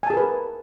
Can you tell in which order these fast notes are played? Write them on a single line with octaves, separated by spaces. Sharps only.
G#5 A5 G#4 A#4 B4